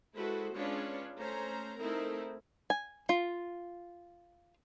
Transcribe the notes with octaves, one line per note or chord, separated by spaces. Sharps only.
G#3 E4 F#4 A4 B4 C5
G#3 C#4 D4 F4 B4 C#5
A3 C#4 C5 A#5
A3 C4 D#4 E4 A#4
G#5
F4